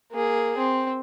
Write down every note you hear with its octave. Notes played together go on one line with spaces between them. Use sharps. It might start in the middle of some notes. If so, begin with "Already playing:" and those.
A#3 G#4
C4